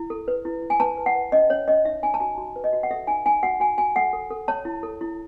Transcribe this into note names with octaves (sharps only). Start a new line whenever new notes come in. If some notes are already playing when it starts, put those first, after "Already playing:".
Already playing: E4
A4
B4
E4
E4
G#5
B4 A5
B4
F#5
B4
C#4 D#5
C#4 C#5
C#4 D#5
D#4 E5
D#4 G#5
A5
F#4 G#5
F#4
B4
D#5
F#4
F#5
A4 E5
D#4 G#5
D#4 G#5
F#4 F#5
F#4 G#5
F#4 G#5
A4 F#5
A4
A4
C#5 A5
E4
A4
E4